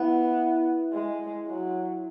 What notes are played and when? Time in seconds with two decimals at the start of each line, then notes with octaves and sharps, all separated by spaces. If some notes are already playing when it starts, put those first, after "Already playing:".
Already playing: B3 E4
0.92 G#3
1.47 F#3